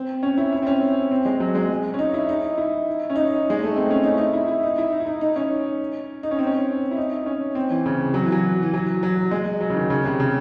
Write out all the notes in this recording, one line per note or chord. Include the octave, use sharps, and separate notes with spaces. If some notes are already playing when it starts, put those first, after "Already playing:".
Already playing: C4
C#4
E4
E4
C4
C#4
C4
G#3
F#3
G#3
C#4
D#4
E4
D#4
E4
C#4
D#4
G#3
A3
C4
C#4
D#4
E4
D#4
E4
E4
D#4
E4
D#4
E4
D#4
D#4
C#4
D#4
C#4
C4
C#4
E4
D#4
C#4
C4
E3
C#3
F#3
E3
F#3
E3
F#3
F#3
G#3
F#3
C#3
D#3
C#3
C3
C#3